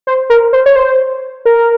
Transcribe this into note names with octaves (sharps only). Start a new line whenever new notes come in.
C5
A#4
C5
C#5
C5
A#4